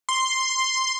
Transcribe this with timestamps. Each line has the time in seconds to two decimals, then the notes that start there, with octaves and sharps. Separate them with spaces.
0.09 C6